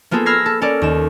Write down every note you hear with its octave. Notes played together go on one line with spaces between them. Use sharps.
A#3 B3 F4 G#4 A4
B5 E6 F6 G#6 A#6 C7
A4
C#4 A4 A#4 D5
D#2 E7